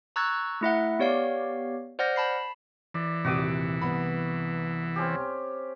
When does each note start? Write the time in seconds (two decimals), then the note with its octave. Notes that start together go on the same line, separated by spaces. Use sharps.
0.16 A#5 C#6 E6 F#6 G#6 A6
0.61 A3 E4 E5 F#5
0.99 B3 G4 C#5 D5 F5
1.99 C5 D5 F#5 F6 G6 A#6
2.16 A5 B5 C7
2.94 E3 D5
3.24 D#1 C3 F#4 D6 D#6
3.81 C2 B3 B5
4.96 C4 C#4 G4